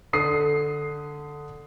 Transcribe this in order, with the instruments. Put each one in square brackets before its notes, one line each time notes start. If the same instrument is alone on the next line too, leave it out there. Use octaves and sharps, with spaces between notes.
[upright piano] D3 D#6 C7